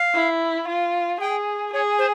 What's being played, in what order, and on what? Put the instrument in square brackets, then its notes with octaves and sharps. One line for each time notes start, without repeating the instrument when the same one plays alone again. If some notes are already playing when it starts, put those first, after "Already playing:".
Already playing: [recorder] F5
[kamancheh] E4
F4
[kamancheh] G#4 [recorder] G5
[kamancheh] G#4 [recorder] C#5
[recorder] C5